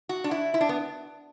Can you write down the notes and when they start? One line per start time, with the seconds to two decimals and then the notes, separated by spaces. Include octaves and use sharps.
0.09 F#4
0.24 D4
0.31 E4
0.54 E4
0.61 D4
0.69 B3